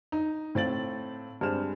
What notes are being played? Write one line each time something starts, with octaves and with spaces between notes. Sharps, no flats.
D#4
A2 C4 F5 A6 F#7
G2 G#3 C4 C5 F6 E7